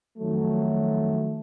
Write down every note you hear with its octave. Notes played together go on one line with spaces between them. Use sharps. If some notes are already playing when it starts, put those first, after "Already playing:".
F2 D#3 F#3 A3